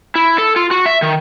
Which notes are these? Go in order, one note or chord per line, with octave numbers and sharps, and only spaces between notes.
E4
A4
F4
F#4
E5
D#3